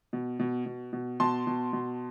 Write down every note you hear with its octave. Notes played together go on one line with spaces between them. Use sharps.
B2
B2
B2
B2
B2 A5 C6
B2
B2